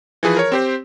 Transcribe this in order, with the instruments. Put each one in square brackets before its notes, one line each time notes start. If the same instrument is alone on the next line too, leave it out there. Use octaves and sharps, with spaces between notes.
[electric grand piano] E3 F3 G#4 B4
A#4 C#5
C4 G4 C5